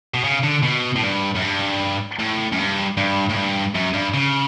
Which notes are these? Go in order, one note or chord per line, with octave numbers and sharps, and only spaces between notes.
B2
C#3
D3
B2
A2
G2
F#2
G2
A2
F#2
G2
G2
A2
G2
F#2
G2
C#3